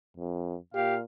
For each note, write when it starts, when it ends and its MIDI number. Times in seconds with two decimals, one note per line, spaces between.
0.17 0.57 41
0.74 1.04 46
0.74 0.96 67
0.74 0.97 77